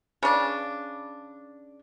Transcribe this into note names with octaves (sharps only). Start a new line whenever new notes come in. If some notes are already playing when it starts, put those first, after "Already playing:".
C#3 D4